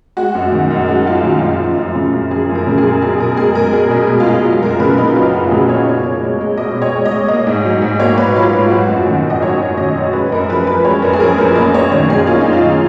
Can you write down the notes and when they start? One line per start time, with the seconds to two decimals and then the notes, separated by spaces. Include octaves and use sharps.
0.17 G#3 F#4
0.35 F#2
0.52 D#3
0.70 F#2
0.88 G#3 F#4
1.06 F#2 F4
1.23 D#3 F4
1.41 F#2 F4
1.60 F3
1.77 F#2
1.95 C#3
2.13 F#2
2.31 F3 G#4
2.49 F#2
2.55 A#4
2.67 C#3
2.78 G#4
2.84 F#2
3.02 B2 G#4
3.19 B2 A#4
3.37 G#3 G#4
3.55 G#3 A#4
3.73 B2 G#4
3.90 B2
4.08 G#3
4.20 F4
4.27 G#3
4.44 F#3 F4
4.62 F#2 A#4
4.80 C#3 B4
4.98 A#3 D#4
5.16 F#3 F4
5.33 F#2 F#4
5.51 C#3 G#4
5.69 A#3 C#5
5.86 B2
6.05 B2
6.23 G#3
6.41 G#3
6.58 B2 D#5
6.76 B2
6.82 C#5
6.94 G#3
7.05 D#5
7.11 G#3
7.28 A#3 D#5
7.47 G#2
7.65 F#3
7.82 G#2
8.00 A#3 C#5
8.18 G#2 B4
8.36 F#3 F4
8.53 G#2
8.71 F#3 F#4
8.89 F#2
9.07 D#3
9.24 F#2
9.30 D#5
9.42 F#3 C#5
9.60 F#2
9.78 D#3 D#5
9.96 F#2
10.13 G#3 B4
10.32 F#2 A#4
10.49 F3 B4
10.67 F#2 B4
10.85 G#3 C#5
11.02 F#2 A#4
11.13 G#4
11.20 F3 A#4
11.38 F#2 B4
11.55 A#3 D#5
11.74 F#2 C#5
11.92 D#3 C#5
12.10 F#2 G#4
12.27 A#3 F4
12.41 F#2 D#4
12.53 F4
12.63 D#3